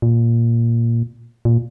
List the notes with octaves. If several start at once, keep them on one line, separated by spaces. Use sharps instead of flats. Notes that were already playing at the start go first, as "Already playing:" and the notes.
A#2
A#2